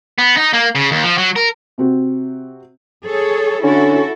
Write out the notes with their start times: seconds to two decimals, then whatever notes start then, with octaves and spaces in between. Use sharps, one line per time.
0.18 B3
0.37 D#4
0.53 A#3
0.75 C#3
0.91 D#2
1.03 F3
1.18 F#3
1.36 A#4
1.78 C3 C4 F#4
3.05 G#4 A4 C#5
3.64 D3 C#4 E4 F#4 A4